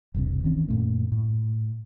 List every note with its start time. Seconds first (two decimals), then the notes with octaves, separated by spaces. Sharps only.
0.14 E1 C2 G2 C3
0.44 D#3 E3 C4 C#4
0.68 F#2 A#2 A3
1.12 A2